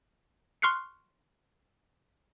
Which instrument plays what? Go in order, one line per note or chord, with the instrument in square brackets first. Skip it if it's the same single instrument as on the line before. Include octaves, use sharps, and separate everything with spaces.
[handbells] C6 C#6 F6 F#6 C7 C#7